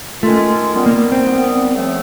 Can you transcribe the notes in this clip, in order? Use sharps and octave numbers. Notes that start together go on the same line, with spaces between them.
D#3 G#3 A3 C#4 F4
D#3 G3 B3
A#3
C4
D#3 G3 B3
C#3 F3 A3 C4